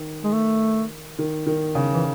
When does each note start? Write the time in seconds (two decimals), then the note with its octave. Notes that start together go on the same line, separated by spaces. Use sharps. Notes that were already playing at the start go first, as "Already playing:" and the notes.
Already playing: D#3
0.24 G#3
0.32 A3
1.19 D#3
1.46 D#3
1.75 C#3
1.93 E3